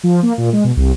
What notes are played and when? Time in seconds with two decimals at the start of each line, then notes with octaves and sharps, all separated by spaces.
0.03 F3
0.23 A#3
0.38 A#2
0.53 G#3
0.64 B2
0.77 C2